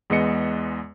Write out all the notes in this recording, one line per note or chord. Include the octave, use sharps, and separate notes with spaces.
E2 G#3 B3 D#5 C#7